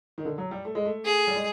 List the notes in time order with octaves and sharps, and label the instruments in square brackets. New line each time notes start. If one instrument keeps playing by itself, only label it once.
[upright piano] D#3
D3
F#3
G3
A3
G#3
A3
[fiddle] G#4
[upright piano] G3
G#3